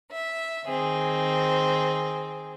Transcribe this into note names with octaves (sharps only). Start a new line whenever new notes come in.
E5
D#3 C4 G#4